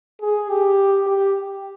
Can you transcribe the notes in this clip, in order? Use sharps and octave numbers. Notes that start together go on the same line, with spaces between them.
G#4
G4
G4